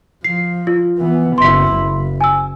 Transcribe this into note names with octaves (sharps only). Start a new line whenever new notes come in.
F3 C7
F4
E3 B3
F#1 E4 C6 B6
F#1
G#5 E6